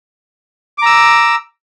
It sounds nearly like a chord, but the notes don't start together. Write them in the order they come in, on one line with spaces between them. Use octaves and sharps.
D6 A#5 E6